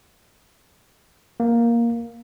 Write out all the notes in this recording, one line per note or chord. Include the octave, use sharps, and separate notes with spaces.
A#3